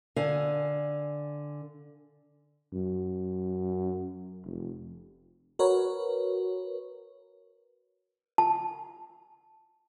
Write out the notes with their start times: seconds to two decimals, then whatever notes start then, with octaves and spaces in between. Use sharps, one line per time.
0.16 D3 F5 G#5
2.73 F#2
4.45 F1
5.59 F#4 A#4 B4 C#5
8.38 A5